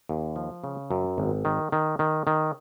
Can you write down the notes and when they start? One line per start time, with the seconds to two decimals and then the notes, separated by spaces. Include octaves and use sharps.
0.09 D#2
0.36 F3
0.64 C#3
0.91 F#2
1.18 G#1
1.45 D#3
1.72 D#3
1.99 D#3
2.27 D#3